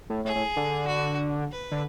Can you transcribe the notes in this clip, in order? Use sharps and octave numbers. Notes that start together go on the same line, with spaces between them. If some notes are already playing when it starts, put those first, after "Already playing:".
A2
A2 G#4
A2
D3
F#4
B4
D3